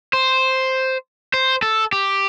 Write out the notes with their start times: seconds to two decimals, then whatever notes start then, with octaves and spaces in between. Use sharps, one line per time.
0.13 C5
1.34 C5
1.62 A4
1.93 G4